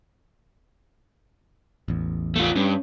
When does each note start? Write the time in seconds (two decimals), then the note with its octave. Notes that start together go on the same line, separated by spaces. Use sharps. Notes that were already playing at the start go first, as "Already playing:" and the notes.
1.88 A1 E2
2.36 A3 F4
2.56 G2 C#4